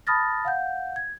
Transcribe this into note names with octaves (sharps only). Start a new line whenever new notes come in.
A5 B5 D#6 F6 A6 A#6
F5 F#5 G6
G#6